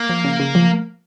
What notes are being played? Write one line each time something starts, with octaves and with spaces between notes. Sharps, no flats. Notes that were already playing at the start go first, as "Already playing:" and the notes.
Already playing: A#3
F3
C#3
C#3
F3